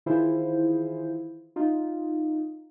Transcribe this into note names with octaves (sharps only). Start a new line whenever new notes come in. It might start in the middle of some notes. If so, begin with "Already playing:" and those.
D#3 E3 E4 F4 G#4 C5
D#4 F4